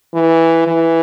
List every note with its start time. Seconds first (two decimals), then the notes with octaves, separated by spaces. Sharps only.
0.14 E3
0.67 E3